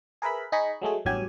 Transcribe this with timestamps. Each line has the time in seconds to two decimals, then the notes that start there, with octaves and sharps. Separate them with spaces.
0.22 G#4 A#4 B4 E5 B5
0.52 D#4 G#4 D#5 B5 C#6
0.82 F#3 G#3 A3 G#4
1.05 A1 E2 G2 F#3 G4 G#5